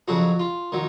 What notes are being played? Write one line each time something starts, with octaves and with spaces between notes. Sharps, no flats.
F2 C#3 F#3 F#4
F4
D#3 F#3